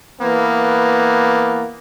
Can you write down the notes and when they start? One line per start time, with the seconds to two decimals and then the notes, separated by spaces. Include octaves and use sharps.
0.21 E3 A#3 B3